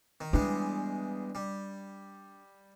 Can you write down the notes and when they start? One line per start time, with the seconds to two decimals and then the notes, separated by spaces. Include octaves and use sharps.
0.21 D#3
0.33 E2 G3 G#3 D4
1.35 G3